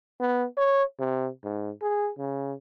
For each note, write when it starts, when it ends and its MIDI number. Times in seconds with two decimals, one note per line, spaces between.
0.20 0.45 59
0.57 0.83 73
0.99 1.28 48
1.44 1.70 44
1.82 2.10 68
2.18 2.53 49